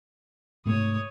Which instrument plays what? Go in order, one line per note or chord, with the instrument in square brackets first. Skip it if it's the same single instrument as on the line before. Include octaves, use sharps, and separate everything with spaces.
[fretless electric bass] G#2 C3 A3 [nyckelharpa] C#5 D#6